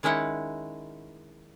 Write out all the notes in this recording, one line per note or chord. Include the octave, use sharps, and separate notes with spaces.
D#3 G#3 C#4 D#4 E4 F#5